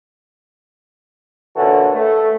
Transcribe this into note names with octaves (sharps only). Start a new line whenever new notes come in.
A#2 D3 E3 C#4 F#4 A4
A3